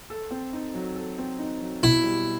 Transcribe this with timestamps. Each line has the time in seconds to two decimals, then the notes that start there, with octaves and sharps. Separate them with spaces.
0.10 A4
0.31 C4
0.53 D#4
0.74 F#3
0.96 A4
1.18 C4
1.39 D#4
1.61 F#3
1.83 B2 E4
2.04 G3